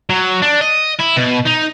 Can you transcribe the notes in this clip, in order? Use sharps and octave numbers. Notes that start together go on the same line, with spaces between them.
F#3
D4
D#5
E4
B2
D#4